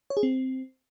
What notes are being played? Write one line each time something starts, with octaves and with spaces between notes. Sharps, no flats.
C#5
G#4
C4